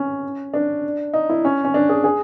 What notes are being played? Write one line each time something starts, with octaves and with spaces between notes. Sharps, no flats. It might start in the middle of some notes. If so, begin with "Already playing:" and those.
Already playing: C#4
D4
D#4
E4
C#4
C#4
D4
G#4
G#4